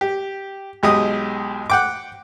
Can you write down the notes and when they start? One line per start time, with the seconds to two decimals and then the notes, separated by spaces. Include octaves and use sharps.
0.01 G4
0.83 B1 G#3 G4 D#6
1.70 F#5 G5 D6